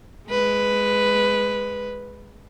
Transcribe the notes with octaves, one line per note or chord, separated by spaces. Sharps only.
G#3 B4